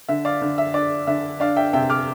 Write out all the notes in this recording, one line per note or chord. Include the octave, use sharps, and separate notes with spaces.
D3 E5
D5 F5
D3
E5
D4 D5
D3 E5
D4 D5 F5
E5 G5
C3 E5 G5
D6 F6